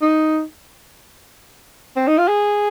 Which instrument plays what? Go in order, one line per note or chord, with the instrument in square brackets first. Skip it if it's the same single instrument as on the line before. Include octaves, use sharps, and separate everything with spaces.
[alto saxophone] D#4
C4
D#4
F4
G#4